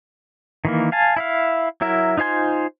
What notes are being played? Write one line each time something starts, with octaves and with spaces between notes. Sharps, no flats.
D#3 E3 A#3
F5 G#5 A5
E4 E5 F5
F#3 E4 A#4 E5
D#4 F4 C5 G#5 C6